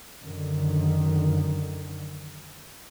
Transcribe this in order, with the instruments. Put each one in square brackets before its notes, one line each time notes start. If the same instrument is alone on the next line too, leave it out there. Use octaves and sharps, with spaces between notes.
[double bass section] F#2 D3 D#3